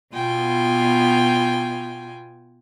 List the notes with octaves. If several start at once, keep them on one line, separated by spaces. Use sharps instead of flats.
B2 B3 F4 G5 G#5